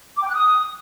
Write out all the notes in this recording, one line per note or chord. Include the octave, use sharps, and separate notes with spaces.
D6
G5
F#6
D#6